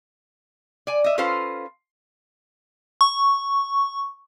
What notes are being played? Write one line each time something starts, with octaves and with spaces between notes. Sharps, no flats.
D5 G#5
D#5 E5
C#4 F4 A4 B4 C5 F5
C#6